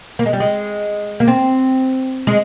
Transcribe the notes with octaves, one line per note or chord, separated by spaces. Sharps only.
A#3
G#3
G3
G#3
A#3
C4
G#3